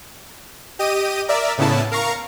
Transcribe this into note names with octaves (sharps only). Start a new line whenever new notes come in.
G4 D#5 D#7
A#4 D5 E5
A2 C#3 B3 E4 A5
A#4 F5 A#5 C#6